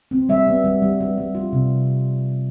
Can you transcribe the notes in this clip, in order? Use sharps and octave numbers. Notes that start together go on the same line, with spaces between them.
C4
G3 E5
B3
G3
G3
G3
G3
F4
C3